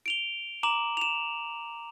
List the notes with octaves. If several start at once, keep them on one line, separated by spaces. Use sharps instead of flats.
D7 F7 G7
A#5 D6 E7 F#7
E7 F7